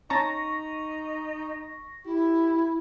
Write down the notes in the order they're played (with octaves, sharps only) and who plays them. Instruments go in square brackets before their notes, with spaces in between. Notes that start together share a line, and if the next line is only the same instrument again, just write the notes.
[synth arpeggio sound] C#4 A5 A#5 [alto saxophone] D#4 [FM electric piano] C#6 A#6
[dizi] E4 [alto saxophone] G4